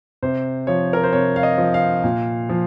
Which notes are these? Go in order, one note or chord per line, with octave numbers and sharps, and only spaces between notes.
C3 C5
F3 C#5
A#4
C5
C3 C#5
F5
D#5
F3
F5
A#2
F3